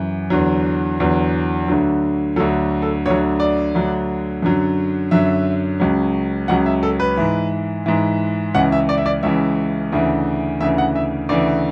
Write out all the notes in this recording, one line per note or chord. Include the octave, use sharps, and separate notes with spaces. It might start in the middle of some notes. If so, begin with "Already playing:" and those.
Already playing: F#2 E3
E2 D3 F#3
E2 D3 F#3
D2 D3 F#3
D2 D3 F#3 A4
A4
D2 D3 F#3 C#5
D5
D2 D3 F#3
F#2 D3 F#3
F#2 D3 F#3 E5
C#2 C#3 F#3
C#2 C#3 F#3 F#5
E5
A4
B4
G#2 E3
G#2 E3
C#2 C#3 E3 F#5
E5
D5
E5
D5
C#2 C#3 E3 E5
D2 C#3 E3
D2 C#3 E3 E5
F#5
E5
D2 C#3 E3 D5